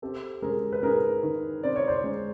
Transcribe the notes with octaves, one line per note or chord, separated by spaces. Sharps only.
C4 G4 A4
G#3 G#4 A#4
B4
G#2 G#4 A#4
D#3
C4 D5
C#5
C5 D5
G#3